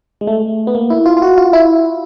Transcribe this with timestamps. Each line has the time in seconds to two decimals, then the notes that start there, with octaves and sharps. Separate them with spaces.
0.21 G#3
0.27 A3
0.67 B3
0.75 A#3
0.90 E4
1.06 F4
1.17 F4
1.22 F#4
1.38 F4
1.53 E4